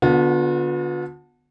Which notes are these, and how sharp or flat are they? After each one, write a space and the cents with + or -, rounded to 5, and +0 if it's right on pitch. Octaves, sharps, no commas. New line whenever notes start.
D3 +0 B3 +0 F4 +45